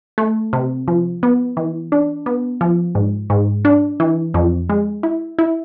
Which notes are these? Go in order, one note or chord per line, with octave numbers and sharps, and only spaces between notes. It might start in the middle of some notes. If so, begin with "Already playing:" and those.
A3
C3
F3
B3
E3
D4
B3
F3
G#2
G#2
D4
E3
F2
G#3
E4
E4